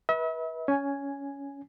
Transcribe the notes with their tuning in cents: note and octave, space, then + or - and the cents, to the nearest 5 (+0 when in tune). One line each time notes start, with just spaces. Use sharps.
B4 -25 E5 -40
C#4 +15 G#5 +0